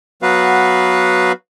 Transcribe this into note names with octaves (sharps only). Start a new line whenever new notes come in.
F#3 B3 F#4 B4 F5